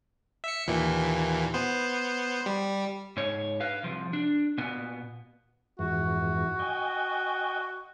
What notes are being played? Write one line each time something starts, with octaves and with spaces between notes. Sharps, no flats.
E5 C#7
D#2 A#2 E3
B3 C5
G3
G#2 C#5
B4 F5
C2 F3
D4
A#2 B3
F2 G#2 E3 F#4
D#5 G5 G#5